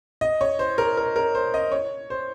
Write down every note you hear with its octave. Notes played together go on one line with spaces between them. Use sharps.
D#5
C#5
C5
A#4
A#4
A#4
C5
D#5
C#5
C5